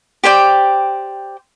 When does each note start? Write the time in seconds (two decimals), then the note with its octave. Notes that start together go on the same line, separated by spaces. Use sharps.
0.24 G4 C5 D5 G5